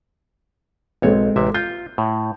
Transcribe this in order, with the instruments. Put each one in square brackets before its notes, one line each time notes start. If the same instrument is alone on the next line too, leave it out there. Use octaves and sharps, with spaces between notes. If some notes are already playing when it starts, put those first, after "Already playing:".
[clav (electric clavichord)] B1 C#5 [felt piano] G#3 C4 A4
[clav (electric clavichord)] A1 C3 E5
[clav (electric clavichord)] F4 [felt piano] G6
[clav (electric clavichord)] A2